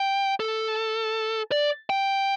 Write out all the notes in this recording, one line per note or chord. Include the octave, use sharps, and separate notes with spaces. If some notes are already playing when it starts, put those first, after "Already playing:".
Already playing: G5
A4
D5
G5